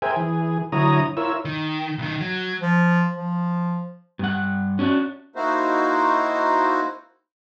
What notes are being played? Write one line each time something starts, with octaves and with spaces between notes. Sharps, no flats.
G#4 A#4 C5 E5 G5 G#5
E3 G#4
D3 F#3 E4 C#5 A#5 D#6
E4 F4 A#4 C#5 E6
D#3
B1 D#3
F#3
F3
F3
G2 F#5
C#4 D4 F#4
A#3 D#4 E4 F#4 C5